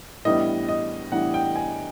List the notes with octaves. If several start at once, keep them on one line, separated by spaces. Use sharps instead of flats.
A2 E3 G3 B3 D4 D#5
D#5
A2 E3 G3 B3 D4 F#5
G5
G#5